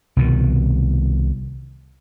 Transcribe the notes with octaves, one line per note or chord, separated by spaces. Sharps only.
C2 B2 D#3